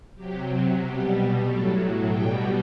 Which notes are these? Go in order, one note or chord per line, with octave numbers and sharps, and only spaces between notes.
C3 F#3 G4
B2 G3 G4
A2 F#3 A4
B2 G3 G5